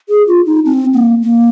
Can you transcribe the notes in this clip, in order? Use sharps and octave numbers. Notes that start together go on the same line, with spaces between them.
G#4
F4
D#4
C4
A#3
A#3